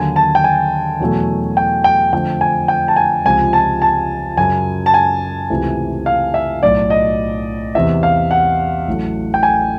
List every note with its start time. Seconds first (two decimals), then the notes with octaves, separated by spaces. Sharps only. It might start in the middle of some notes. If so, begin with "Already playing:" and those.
Already playing: D#2 D3 F#3 G#5
0.16 A5
0.35 G5
0.44 G#5
1.00 E2 B2 F#3 A3
1.57 G5
1.84 G5
2.13 F2 D3 F3 A3 G5
2.41 G#5
2.68 G5
2.88 A5
2.96 G#5
3.25 C#2 C3 F3 G#3 G#5
3.53 A5
3.82 A5
4.37 F#2 C#3 F#3 G#5
4.86 A5
4.94 G#5
5.50 C#2 C3 E3 A3
6.06 F5
6.34 E5
6.62 B1 A2 F#3 D5
6.90 D#5
7.75 E2 C3 E3 E5
8.03 F5
8.31 F#5
8.88 A1 A2 F#3 A3
9.34 G5
9.43 G#5